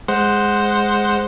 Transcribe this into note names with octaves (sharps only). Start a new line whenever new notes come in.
G#3 C5 F#5